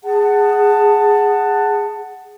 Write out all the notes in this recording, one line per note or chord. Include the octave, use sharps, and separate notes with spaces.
G#4 F#5 A5